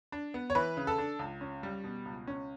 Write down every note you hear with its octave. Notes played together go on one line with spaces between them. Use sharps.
D4
B3
C#5
E3 B4
C#3
A4
D4
C#2
C#4
G3
B2
C#2
C#4